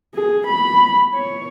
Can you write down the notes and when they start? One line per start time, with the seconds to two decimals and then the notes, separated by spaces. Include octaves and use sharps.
0.15 G#4
0.47 B5
1.14 C#5